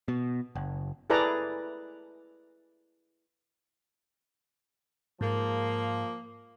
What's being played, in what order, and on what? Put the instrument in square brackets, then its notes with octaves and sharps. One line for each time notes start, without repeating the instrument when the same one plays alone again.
[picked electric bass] B2
F#1
[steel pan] E4 G#4 A4 B4 D5 A#5
[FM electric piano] G#2 [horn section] F3 A#3